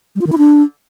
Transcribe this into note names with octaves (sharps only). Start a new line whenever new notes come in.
G3
F4
D#3
E4
D4